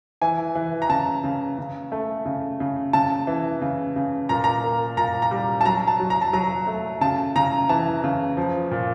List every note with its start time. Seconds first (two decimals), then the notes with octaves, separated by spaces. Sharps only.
0.22 E3 G#5
0.55 E3
0.82 A#5
0.89 C#3 A5
1.24 C#3
1.58 C#3
1.92 A3
2.25 C#3
2.60 C#3
2.93 C#3 A5
3.27 E3
3.61 C#3
3.96 C#3
4.29 A#2 A#5
4.44 A#5
4.64 A#3
4.97 A#2 A#5
5.22 A#5
5.31 G3
5.61 A5
5.65 F#3 A#5
5.87 A5
6.00 F#3
6.10 A#5
6.22 A5
6.33 F#3 A#5
6.67 A3
7.01 C#3 A5
7.36 C#3 A#5
7.69 E3 A5
8.04 C#3
8.37 F3
8.71 A#2